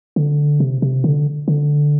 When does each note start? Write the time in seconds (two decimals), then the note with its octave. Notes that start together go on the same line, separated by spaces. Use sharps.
0.16 D3
0.60 C3
0.82 C3
1.04 D3
1.48 D3